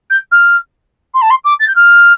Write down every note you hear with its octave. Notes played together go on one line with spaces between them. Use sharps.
G6
F6
C6
A5
C6
D6
A6
G6
F6